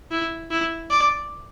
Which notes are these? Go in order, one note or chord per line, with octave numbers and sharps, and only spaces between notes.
E4
E4
D5